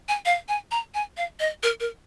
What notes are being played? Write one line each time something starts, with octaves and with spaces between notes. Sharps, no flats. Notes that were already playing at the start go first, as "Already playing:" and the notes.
G#5
F5
G#5
A#5
G#5
F5
D#5
A#4
A#4